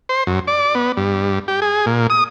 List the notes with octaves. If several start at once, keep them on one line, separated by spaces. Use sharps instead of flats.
C5
F#2
D5
B3
G2
G4
G#4
A#2
D#6